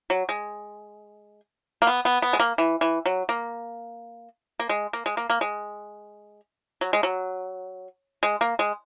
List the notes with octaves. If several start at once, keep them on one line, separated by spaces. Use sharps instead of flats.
F#3
G#3
A#3
B3
B3
B3
G#3
A#3
E3
E3
F#3
A#3
A#3
G#3
A#3
G#3
A#3
A#3
G#3
F#3
G#3
F#3
G#3
A#3
G#3